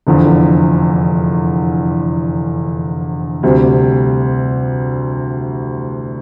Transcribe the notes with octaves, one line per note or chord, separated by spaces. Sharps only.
F1 E2 D3 F3
D2 C3 G3